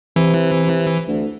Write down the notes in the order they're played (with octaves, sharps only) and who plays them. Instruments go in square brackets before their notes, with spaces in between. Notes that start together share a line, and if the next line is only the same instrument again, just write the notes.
[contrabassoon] C3 [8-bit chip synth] E3
[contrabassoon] C3
D2